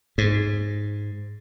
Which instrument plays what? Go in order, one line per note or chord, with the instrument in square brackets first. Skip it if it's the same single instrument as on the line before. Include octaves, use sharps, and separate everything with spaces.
[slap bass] G#2